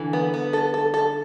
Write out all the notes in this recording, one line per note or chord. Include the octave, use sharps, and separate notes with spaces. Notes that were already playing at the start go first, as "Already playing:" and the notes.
Already playing: D3 E3
B3
B3
A4
A4
A4